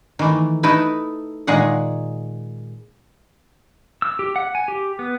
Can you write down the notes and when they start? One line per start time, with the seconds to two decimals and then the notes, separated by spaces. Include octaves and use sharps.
0.19 D#3 E3 A3
0.63 A3 D#4 E4 B4
1.47 A#2 D#3 G#3 G#4 F#5
4.02 E6
4.19 G4
4.36 F#5
4.55 G#5
4.68 G4
4.99 B3